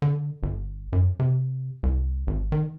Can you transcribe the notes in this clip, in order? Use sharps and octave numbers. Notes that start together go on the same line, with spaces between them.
D3
G1
F#2
C3
C2
G#1
D#3